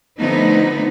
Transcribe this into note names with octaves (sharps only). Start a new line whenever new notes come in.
D3 F3 A3 B3 C4 D#4